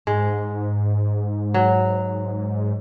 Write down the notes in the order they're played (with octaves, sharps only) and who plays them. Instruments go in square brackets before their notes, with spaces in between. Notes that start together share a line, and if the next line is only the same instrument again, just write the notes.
[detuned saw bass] G#2 [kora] G#3
[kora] F#3